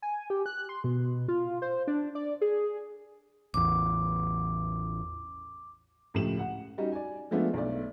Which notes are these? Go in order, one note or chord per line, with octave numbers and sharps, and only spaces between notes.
G#5
G4
F#6
C6
B2
F4
C5
D4
D5
G#4
A1 E2 D6
C#2 A2 F3 G4 E7 F#7
F#5
G3 C#4 D#4 F#4
D5 G#5
F3 G#3 A3 B3 D4 F4
B1 A3 D5